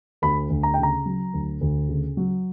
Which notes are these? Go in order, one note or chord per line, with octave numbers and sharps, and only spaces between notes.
D2 B5
D2
A#5
C#3 G5
A#5
F#3
D2
D2
C#3
F#3